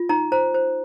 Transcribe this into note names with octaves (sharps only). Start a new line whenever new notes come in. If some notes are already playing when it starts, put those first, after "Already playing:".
Already playing: F4
D#4 A#5
C5 A#5
C5